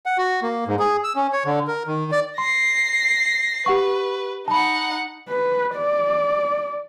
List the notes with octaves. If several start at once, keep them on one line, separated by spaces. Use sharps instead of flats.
F#5
F#4
A#3
G#2
G#4
E6
C#4
C#5
D3
A#4
D#3
D5
C6 A#6 C7
G4 B4 F#5 C#6
D#4 F#5 A5 B5
B4
D5